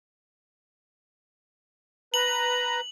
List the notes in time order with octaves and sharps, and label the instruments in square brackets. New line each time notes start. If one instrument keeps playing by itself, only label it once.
[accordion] B4 A#5 [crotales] F#7